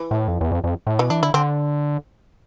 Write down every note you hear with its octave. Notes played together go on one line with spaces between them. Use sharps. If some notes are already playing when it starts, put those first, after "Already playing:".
Already playing: E3
A2
F2
E2
F2
F2
A2
B2 E3
E3 D4
D3 E4
D3 C4